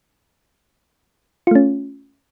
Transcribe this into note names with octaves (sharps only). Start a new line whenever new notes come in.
A3 C#4 F4